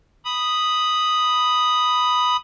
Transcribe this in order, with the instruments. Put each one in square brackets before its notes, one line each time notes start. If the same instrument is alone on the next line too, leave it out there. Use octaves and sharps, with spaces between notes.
[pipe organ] B5 D#6